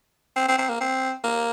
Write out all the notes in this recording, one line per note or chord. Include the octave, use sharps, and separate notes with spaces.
C4
C4
C4
A#3
C4
A#3